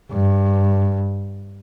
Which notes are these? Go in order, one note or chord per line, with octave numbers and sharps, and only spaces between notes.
G2